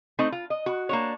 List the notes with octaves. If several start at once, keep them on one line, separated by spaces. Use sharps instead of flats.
A3 C4 D#4
F4
D#5
F#4
A#3 D4 C#5